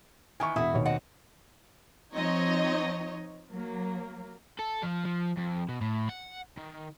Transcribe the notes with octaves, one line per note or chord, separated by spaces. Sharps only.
D#3 E3 G#5 C#6
E1 E4 F#4 E5 D#6
D#2 B2 C#5
C4 D#5 F#5
F3 C4 D#4 C#5 D#5
F#3 A#3
A4
F3
F3
F2
B2
A2
F#5
D#3